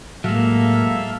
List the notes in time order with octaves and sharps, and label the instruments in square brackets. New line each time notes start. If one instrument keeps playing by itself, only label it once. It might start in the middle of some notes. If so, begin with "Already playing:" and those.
[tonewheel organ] A2 [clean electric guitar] F#3 G#3 [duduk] A#3 [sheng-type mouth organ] A4 E5 F5